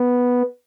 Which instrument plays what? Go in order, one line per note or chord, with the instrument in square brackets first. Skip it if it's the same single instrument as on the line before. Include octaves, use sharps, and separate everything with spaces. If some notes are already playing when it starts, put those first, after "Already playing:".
Already playing: [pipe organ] B3